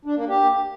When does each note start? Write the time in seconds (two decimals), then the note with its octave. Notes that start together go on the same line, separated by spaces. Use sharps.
0.05 D4
0.17 A#3
0.28 G4